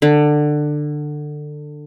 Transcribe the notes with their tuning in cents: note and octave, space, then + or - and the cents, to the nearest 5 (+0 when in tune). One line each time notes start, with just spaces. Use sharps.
D3 +20